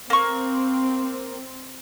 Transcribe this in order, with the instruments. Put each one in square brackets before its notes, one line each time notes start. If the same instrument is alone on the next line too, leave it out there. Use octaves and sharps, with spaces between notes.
[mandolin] A#3 C#6 [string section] C4